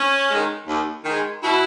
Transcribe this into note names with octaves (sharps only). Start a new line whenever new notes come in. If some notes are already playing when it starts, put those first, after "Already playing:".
Already playing: C#4
D#3 G#3
D#2
D#3 G#3
B2 E4